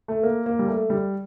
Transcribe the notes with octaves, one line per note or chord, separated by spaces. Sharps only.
A3
A#3
A#3
G3
A3
G3